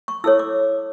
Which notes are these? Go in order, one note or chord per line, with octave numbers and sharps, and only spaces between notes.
C#6
E4 A4 C#5 E6
D6